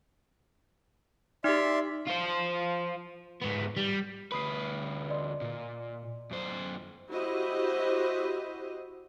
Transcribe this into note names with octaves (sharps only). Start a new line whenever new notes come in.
D#4 G4 D5 E5 C6
F4 C5
G#2 B3
G3
D2 B4 B5 D#6 C7
D5 D#5 C6
A#2
F#2 C5
E4 F#4 G4 C5 D#5